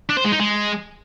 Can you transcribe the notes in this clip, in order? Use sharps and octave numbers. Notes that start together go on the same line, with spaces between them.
D4
C5
G#3
D#4
G#3